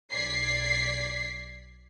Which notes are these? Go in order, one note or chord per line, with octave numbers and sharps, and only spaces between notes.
B1 D5 G#6 B6 C7